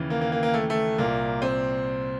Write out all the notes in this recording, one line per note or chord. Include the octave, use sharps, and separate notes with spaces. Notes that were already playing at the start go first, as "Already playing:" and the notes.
Already playing: D#2 C#3 E3
A#3
A#3
A#3
A#3
A3
A3
C2 A#2 A#3
C4